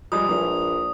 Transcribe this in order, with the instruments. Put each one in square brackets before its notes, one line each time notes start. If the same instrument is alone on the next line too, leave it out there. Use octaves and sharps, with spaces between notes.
[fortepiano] F3 G3 G#3 [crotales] D#6
[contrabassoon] A#1 [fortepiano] E3